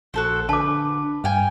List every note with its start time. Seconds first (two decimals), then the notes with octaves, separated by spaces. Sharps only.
0.14 A#1 F#4 A4 C5
0.49 D3 B4 A5 D6
1.24 G2 F5 G5 G#5